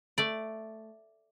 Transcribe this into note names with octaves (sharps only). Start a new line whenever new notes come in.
A3 D5